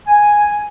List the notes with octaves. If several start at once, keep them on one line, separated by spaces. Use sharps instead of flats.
G#5